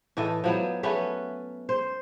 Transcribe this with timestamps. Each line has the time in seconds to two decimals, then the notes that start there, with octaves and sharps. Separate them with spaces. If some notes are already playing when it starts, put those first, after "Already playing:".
0.17 A2 E3 A4 D#5
0.44 F3 F#3 B3
0.83 A3 B3 C#4 B4
1.69 C5